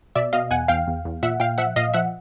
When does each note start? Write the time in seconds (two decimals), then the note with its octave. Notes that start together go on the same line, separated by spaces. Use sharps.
0.15 B2 D5 E5
0.33 B2 D#5 F5
0.51 E2 F#5 G#5
0.68 E2 F5 G5
0.87 E2
1.05 E2
1.23 A#2 E5 F#5
1.40 A#2 F5 G5
1.58 F3 E5 F#5
1.76 A#2 D#5 F5
1.94 F3 E5 F#5